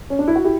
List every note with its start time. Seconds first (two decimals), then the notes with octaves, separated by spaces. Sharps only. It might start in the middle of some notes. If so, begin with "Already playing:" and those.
0.10 C#4
0.19 D4
0.28 E4
0.36 F#4
0.44 E4 G4